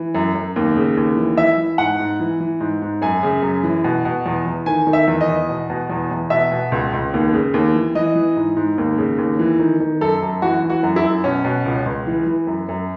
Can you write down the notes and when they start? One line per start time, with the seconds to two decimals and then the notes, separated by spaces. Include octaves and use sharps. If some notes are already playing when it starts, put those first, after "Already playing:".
Already playing: E3
0.14 F#2
0.35 F#2
0.56 D#2
0.76 C#3
0.97 D#2
1.17 E3
1.37 E3 E5
1.58 E3
1.78 G#2 F#5
2.00 G#2
2.20 E3
2.40 E3
2.60 G#2
2.82 G#2
3.02 F#2 G#5
3.23 C#3
3.43 F#2
3.63 E3
3.84 B2
4.05 B2
4.26 E2
4.46 E2
4.66 D#3 G#5
4.87 D#3
4.93 E5
5.07 E2
5.21 D#5
5.28 E2
5.49 B2
5.70 B2
5.90 E2
6.11 E2
6.30 B2 E5
6.52 B2
6.72 C#2
6.93 C#2
7.14 D#2
7.34 C#3
7.54 D#2
7.75 E3
7.95 E3 D#5
8.15 E3
8.36 G#2
8.56 G#2
8.78 D#2
8.98 C#3
9.18 D#2
9.39 E3
9.59 D#3
9.80 D#3
10.01 F#2 A4
10.22 F#2
10.42 E3 F#4
10.63 E3
10.70 F#4
10.83 F#2
10.96 E4
11.04 F#2
11.24 B2 C#4
11.45 B2
11.66 C#2
11.86 C#2
12.07 E3
12.27 E3
12.47 F#2
12.69 F#2